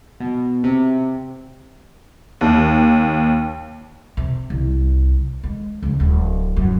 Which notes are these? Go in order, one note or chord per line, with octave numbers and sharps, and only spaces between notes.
B2
C3
D#2
C3
C2
G#3
C#2
D1
F#2